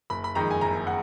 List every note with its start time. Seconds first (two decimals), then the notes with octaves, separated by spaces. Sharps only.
0.10 F#1 B5
0.24 B5
0.35 F2 D#3 G#3 A#5
0.50 G#5
0.61 F#1 A#5
0.87 F#5